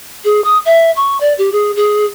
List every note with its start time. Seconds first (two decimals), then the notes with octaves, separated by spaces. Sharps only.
0.24 G#4
0.45 D#6
0.65 E5
0.96 C#6
1.21 D5
1.38 G4
1.52 G#4
1.76 G#4